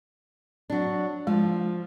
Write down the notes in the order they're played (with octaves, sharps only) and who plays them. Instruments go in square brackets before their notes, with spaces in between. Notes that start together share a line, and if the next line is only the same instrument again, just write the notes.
[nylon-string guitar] F#3 D4
[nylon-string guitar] F3 [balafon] G#3